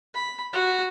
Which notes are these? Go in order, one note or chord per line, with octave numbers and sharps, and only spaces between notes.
B5
F#4